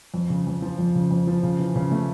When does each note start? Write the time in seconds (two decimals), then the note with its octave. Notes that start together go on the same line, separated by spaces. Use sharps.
0.14 F2
0.30 C#3
0.47 F2
0.62 F3
0.79 F2
0.95 C#3
1.11 F2
1.27 F3
1.43 C#3
1.59 E3
1.76 C#3
1.92 A3